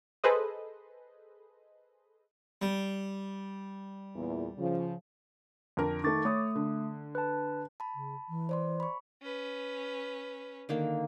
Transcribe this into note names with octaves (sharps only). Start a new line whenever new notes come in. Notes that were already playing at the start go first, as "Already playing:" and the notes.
G#4 A4 B4 C5 D#5
G3
E2 A#2
C#3 F3
F2 D3 A#4
D#3 A3 C#6 D6 A6
A3 C#5 D#6
D3
B4 A5
A5 B5
C#3
E3
C5 D5 C6
B5 C#6
C#4 B4
D3 D#3 A#3